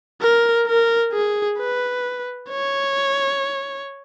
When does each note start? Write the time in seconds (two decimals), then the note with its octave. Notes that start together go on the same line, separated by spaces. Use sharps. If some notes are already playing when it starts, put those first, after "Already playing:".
0.21 A#4
0.67 A#4
1.13 G#4
1.59 B4
2.50 C#5